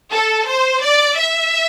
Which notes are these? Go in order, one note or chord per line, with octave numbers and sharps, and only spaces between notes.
A4
C5
D5
E5